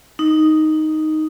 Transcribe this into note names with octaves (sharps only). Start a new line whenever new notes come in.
D#4